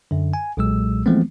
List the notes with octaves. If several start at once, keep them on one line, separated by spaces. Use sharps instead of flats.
F#2 D3
G#5
B1 A#2 F#3 G#3 E6
E3 F3 G#3 A3 B3 C4